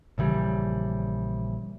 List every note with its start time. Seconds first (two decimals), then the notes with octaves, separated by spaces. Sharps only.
0.18 A#1 C#3 E3 G3